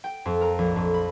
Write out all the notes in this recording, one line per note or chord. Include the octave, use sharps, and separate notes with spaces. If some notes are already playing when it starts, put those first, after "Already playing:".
G5
F2
A#4
A#1
F2
B5